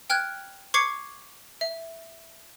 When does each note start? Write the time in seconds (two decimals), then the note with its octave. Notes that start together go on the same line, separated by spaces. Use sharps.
0.10 G5 F6 F#6 G#6
0.74 C#6 D6 G#6 C7 C#7
1.61 E5